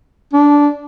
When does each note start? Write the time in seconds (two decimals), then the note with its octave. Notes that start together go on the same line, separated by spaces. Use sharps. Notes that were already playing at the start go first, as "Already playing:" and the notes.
0.33 D4